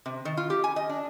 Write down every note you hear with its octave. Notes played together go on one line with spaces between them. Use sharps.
C3
D#3
F4
G4
G#5
D#5
D4